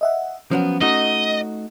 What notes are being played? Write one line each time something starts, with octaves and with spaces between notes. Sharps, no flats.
D#5 E5 F#5
F3 F#3 B3 C#4
A3 D#4 F#4 D#5